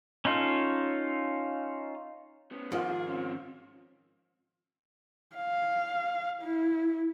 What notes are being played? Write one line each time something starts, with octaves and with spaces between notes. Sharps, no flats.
C#4 D#4 F4 A4
B3 C#4
G#2 D#3 F3 F4
G#4
C4 C#4
F5
E4